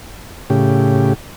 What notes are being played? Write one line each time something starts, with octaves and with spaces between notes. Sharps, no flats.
A2 C#3 G4